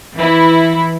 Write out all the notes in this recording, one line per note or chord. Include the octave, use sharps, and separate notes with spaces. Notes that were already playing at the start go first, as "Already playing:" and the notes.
E3 E4